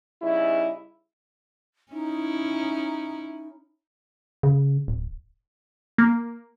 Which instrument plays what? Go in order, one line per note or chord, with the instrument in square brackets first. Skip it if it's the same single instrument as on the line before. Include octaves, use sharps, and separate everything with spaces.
[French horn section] C#3 G3 D#4 E4
[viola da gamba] C#4 E4 [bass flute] D#4
[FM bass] C#3
D1
[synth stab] A#3